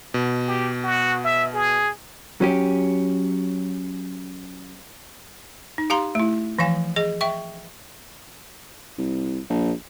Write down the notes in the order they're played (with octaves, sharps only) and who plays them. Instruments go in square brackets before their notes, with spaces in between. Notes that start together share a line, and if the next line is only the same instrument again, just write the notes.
[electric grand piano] B2
[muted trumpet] G4
F#4
E5
G#4
[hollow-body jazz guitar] F#3 C#4 G4
[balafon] D#4
G4 F5 A#5 C6
A3 E4
E3 F3 F5 G#5
G#4 D#5
E5 G5 C#6
[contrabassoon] C2
A#1